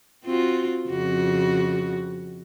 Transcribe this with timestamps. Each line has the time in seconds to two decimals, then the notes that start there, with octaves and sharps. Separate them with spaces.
0.24 C4 F4 F#4
0.89 F2 C#3 F#4